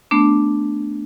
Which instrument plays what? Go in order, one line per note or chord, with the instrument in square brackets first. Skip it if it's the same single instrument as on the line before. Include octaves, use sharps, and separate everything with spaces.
[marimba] A3 B3 D4